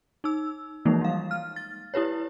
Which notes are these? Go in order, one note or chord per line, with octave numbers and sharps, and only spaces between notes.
D#4 E6
E3 F3 G#3 A#3 D#4
G3 F5
F6
A6
E4 G4 B4 C#5